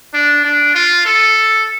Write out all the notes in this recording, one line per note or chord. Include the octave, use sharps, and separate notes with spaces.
D4
D4
F4
A4